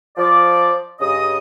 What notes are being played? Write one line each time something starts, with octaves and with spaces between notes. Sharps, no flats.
F3 D5
G2 C#3 D#5 D#6